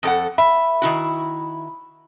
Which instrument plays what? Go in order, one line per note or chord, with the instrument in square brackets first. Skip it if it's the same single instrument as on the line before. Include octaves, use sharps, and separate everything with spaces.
[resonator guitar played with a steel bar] F2 A4 F#5
[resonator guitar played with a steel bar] E5 [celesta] B5
[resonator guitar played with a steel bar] D#3 E4 F#4